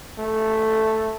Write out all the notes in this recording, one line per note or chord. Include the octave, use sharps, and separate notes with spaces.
A3